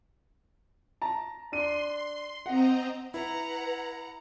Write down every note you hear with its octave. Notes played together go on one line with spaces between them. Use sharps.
A5 A#5
D4 C6 D#7
C4 D#5 F#5 A#5
E4 B4 F#5 A#5